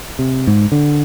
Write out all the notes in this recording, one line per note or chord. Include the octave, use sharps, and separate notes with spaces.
C3
G#2
D3